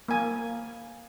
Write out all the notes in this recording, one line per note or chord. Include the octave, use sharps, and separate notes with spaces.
A#3 G#5